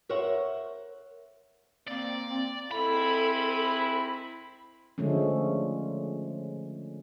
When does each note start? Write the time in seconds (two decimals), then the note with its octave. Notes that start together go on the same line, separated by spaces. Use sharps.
0.09 A#4 C5 C#5 E5 F#5
1.88 A#3 C4 D5
2.71 G#2 C4 E4 A4 B5
4.98 D3 F3 G#3 A3 C#4